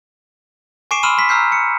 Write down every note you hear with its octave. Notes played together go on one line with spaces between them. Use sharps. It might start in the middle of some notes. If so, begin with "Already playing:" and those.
G#5 C#6 D6 C7 D7 E7
B5 C6 E6 F6 D#7 E7
C6 B6
A#5 E6 F6 G6 C7
C#7